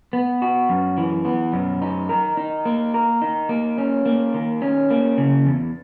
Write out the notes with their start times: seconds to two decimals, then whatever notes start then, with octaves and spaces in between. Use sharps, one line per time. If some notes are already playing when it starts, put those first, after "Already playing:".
0.13 B3
0.42 F#4
0.69 F#2
0.98 E3
1.25 B3
1.53 F#2
1.82 D#4
2.09 A#4
2.37 D#4
2.65 A#3
2.94 A#4
3.22 D#4
3.49 A#3
3.78 C#4
4.06 A#3
4.34 D#3
4.62 C#4
4.91 A#3
5.18 C#3
5.47 E2